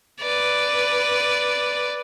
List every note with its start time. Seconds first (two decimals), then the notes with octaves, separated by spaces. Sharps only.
0.21 B4 D5